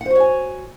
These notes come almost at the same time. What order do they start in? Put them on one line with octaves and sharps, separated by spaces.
F#5 C5 F#4 C#5 G#5